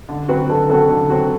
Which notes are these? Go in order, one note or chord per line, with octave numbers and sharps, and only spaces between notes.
D3
F#3 C4 F#4 B4
D3 A4
F#3 C4 F#4 A4
D3
F#3 C4 F#4